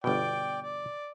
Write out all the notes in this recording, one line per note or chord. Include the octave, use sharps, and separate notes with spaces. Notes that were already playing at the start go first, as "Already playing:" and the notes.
G1 B2 D5 G5
D5